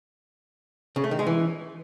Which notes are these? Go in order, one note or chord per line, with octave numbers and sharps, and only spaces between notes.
C#3
A3
D#3
G#3
E3